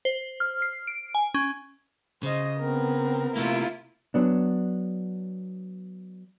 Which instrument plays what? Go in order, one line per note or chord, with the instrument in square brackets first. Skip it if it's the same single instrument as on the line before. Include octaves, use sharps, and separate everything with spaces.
[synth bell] C5
F6
C7
D7
G#5
C#4
[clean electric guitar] C#3 [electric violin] C5 D#5
[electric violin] B3 A#4 [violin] C4
[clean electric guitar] C3 A3 A#3 [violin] E4 F4
[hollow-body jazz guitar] F#3 B3 D4